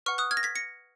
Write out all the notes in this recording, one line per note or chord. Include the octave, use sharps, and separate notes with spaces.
B4 F#5 C#6 F6
D#6 F#6
F6 G#6
A#6
G#6 B6
A#6 C#7